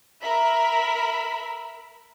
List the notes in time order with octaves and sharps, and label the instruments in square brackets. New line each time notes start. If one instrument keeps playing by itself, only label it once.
[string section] A#4 E5 B5